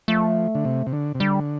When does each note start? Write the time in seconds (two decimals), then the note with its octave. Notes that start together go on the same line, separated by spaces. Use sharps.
0.08 F3 A3
0.55 D3
0.65 C3
0.87 C3
0.93 D3
1.15 C3
1.20 D3 G3